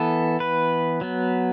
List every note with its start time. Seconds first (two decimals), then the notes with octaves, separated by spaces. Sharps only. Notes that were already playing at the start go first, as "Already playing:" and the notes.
Already playing: E3 B3 A4
0.40 B4
1.01 F#3 B3